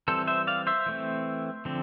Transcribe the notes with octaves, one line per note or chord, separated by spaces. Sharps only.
E3 G3 C4 A4 C5
C5 E5
D5 F5
C5 E5
E3 A3 C4
D3 F3 C4